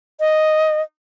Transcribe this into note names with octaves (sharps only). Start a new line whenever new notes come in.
D#5